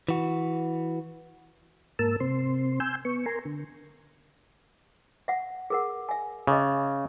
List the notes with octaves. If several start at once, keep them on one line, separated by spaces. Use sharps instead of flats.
E3 F#4
G#2 A#3 A#4 A5 E6
C3 C4 C6
G#5 C6 E6 G6
B3 C#6
A#4 G#5 A#5 C6
D3
E5 F#5
G#4 A#4 F#5
E5 G#5
C#3 G#4 D#5